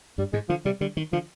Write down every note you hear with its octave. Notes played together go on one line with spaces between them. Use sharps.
G2 G3
G#2 G#3
D3 F3
C3 G3
D3 G3
D#3
D3 F3